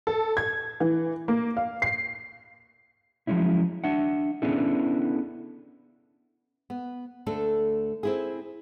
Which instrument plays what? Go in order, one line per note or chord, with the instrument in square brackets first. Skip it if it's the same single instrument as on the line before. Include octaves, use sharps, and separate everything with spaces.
[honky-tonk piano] A4
G#6
E3
A#3
F5
C7
[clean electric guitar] F3 F#3 G#3 C#4 E4
D4 E5 F#5
B3 C#4 D4 E4 G#4 A4
[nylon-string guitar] B3
D2 A3 D4 A4
C4 E4 G#4